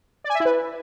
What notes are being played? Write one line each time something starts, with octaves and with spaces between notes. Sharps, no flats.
D5
G#5
E5
E4
B4